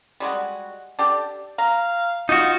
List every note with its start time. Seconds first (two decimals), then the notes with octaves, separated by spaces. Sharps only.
0.20 G3 G#3 F#4
0.99 D4 G4 A4
1.58 F5 A#5
2.29 D#4 F4 F#4